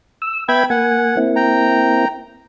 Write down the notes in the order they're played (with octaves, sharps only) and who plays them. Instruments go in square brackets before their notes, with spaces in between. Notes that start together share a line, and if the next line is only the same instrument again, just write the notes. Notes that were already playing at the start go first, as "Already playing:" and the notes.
[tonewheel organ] E6
[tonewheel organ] B3 E5 G#6 [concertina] G5 B5
[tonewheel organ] A#3 G#5 [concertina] F#5
[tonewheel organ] A#3 C4 E4
[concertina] G5 A#5